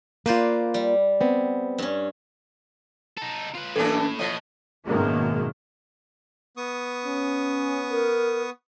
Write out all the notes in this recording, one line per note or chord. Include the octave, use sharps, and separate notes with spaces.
A#3 F4 B4 C5 D5
G3
B3 C4
G2 C#4
D#4 A4
F4 B4
F#2 A2 E3 A#3 D4 A4
A2 E3 F3 D#5
G#1 F#2 B2 D#3 G#3 A#3
B3 C#6 D#6
C#4
A#4